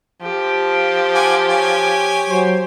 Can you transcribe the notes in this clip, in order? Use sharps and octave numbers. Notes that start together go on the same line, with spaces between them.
F3 G4
F#5 G#5 D6
C#5 G#5
F#3 C5